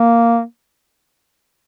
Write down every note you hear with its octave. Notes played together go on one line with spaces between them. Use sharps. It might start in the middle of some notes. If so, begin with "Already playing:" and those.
Already playing: A#3